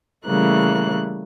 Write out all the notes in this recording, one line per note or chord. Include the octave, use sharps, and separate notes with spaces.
C#3 E3 G3 A3 A#3 F#6